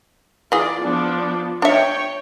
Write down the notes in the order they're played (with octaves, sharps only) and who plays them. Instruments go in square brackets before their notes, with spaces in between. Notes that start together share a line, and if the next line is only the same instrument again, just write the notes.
[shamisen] E3 G#4 [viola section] F4 D5
[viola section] F3 B3 D4
[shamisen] D4 E5 [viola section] C#5 G5